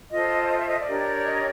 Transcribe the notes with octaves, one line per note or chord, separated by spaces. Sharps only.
F4 A4 C5 D#5
D#5
E5
D#5
D5
D4 G4 A#4 C#5
D#5